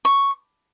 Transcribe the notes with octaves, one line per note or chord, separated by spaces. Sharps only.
C#6